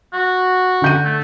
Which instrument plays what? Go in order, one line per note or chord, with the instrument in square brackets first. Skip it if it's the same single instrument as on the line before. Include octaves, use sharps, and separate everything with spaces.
[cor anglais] F#4
[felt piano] D3 G6 D#7
[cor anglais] A3